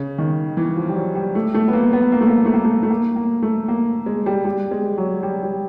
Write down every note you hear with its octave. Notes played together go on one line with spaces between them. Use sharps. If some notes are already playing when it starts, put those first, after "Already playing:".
Already playing: C#3
D#3
E3
F3
G3
F#3
G3
A3
A3
B3
A#3
B3
A#3
A3
A#3
A#3
A3
A#3
A3
A3
A#3
A#3
A3
A#3
G#3
G3
G3
G#3
F#3
G3
G3